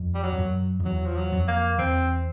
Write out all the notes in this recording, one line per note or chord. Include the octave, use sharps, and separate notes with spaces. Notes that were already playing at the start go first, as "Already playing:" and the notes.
Already playing: F2
G3
F#3
F2
F#2
F2
E2 F#3
F3
F#3
F2
A#3
E2 C4